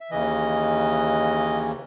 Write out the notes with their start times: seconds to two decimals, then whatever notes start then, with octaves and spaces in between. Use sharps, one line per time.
0.01 E5
0.10 D#2 C#3 E3 D#5